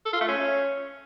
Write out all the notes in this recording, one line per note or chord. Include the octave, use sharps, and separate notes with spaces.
A4
F4
A3
C#4